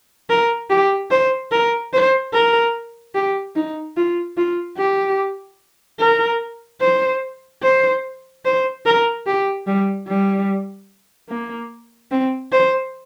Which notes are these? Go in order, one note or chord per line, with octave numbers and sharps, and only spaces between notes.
A#4
G4
C5
A#4
C5
A#4
G4
D#4
F4
F4
G4
A#4
C5
C5
C5
A#4
G4
G3
G3
A#3
C4
C5